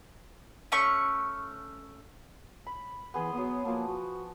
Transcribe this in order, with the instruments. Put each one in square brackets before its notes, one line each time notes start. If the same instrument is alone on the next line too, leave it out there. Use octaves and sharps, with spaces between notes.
[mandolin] A3 C#4 C#6
[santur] B5
[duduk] E3 [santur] B3 G#4 C6
[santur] F#3 D#6 [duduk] B3
[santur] F3 A5 [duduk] A#3
[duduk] F#4